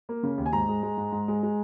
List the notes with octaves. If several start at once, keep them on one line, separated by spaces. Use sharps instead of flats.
A#3
C#3
D#2
G#5
G#2 A#5
G#3
G#3
G#2
G#2
G#3
G#3